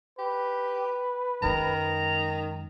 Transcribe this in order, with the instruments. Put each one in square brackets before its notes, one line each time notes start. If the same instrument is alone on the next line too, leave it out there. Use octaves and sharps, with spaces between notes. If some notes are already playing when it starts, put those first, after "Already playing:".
[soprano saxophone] G4 [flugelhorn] B4
[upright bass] F#2 G#3 [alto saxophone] D#3 [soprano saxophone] A#5